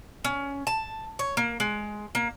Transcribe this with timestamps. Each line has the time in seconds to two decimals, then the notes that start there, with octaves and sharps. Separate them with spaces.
0.25 C#4
0.67 A5
1.19 C#5
1.37 A#3
1.60 G#3
2.15 A#3